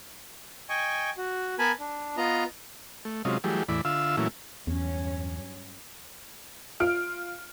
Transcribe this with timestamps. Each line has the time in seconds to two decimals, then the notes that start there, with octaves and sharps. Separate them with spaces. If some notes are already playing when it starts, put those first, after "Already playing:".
0.69 D#5 G5 G#5 C#6
1.17 F#4
1.59 B3 A#4 G#5 A5 B5
1.80 D4
2.17 B3 F4 D#5 A#5
3.05 A3
3.25 C3 F#3 G#3 C#4 F4 D#5
3.44 E3 F#3 G3 A3 G4 G#4
3.69 E2 A2 E3 D5 B5
3.85 D3 F4 E5 F5 E6
4.17 A#2 E3 F#3 A3 C#4 E4
4.67 E2 G2 F#3 C#4
6.80 F4 F6 D7